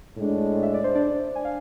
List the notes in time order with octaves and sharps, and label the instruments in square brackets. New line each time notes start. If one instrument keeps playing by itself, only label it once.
[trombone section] A2 G#3 D4
[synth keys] E5
D5
C5
D4 D5
G#5
F5